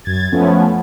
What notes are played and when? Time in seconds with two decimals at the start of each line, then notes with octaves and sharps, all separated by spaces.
0.05 F#2 G#6 A6
0.32 F3 A3 B3 C#4